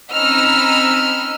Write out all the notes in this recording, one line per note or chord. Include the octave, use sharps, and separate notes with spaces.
C4 C#4 D#4 B5 E6 F6